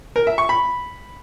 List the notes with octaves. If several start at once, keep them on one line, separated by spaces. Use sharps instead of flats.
A#4
E5
C#6
B5